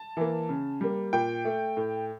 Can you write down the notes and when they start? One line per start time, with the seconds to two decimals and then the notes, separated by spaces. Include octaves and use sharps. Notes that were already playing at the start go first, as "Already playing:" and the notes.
Already playing: A5
0.17 E3 A#3
0.49 C#3
0.81 G3 A#3
1.13 A#2 G5
1.45 A3
1.77 A2